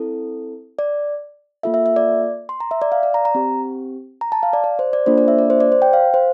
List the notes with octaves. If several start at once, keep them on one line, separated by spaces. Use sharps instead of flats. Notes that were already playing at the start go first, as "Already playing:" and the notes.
Already playing: C4 E4 A4
D5
A#3 F4 A4 E5
E5
E5
D5
C6
A#5
E5
D5
F5
D5
A#5
A#5
C4 G4
A#5
A5
F5
D5
D5
C5
D5
A#3 D4 F4 A4 C5
D5
E5
D5
C5
D5
C5
G5
F5
C5